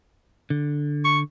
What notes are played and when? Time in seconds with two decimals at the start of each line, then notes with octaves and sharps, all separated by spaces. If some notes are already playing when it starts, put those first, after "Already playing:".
0.50 D3
1.05 C#6